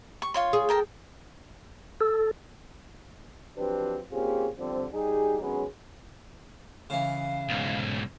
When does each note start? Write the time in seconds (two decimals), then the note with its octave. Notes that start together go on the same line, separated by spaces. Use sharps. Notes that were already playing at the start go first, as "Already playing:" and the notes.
0.22 C#6
0.34 F4 C#5 C6
0.53 G#4
0.69 A4 A#4 G5
2.01 A4
3.57 F3 F#3 C4 D4 G4 B4
4.12 A#3 C4 C#4 F4 G4 G#4
4.58 D3 F3 G3 C4
4.93 G3 D#4 G4 G#4
5.41 D#3 F#3 G#3 B3 C#4 G#4
6.90 C#3 E3 F5
7.49 B1 G#2